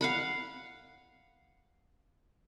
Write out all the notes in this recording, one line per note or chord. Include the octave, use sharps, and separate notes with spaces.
F5 F#5 B5